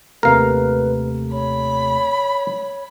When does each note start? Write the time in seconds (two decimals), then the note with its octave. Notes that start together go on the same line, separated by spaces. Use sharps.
0.23 D#2 C3 A3 A#4 B4 F5
1.32 C#5 B5